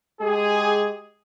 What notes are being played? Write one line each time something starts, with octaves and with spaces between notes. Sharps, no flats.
G#3 G4 G#4